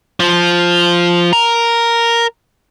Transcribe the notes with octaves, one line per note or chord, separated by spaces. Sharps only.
F3
A#4